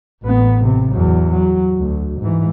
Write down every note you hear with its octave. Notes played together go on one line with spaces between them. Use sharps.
A1 B3
C3
E2 F#3
F#3
D2
G#2 E3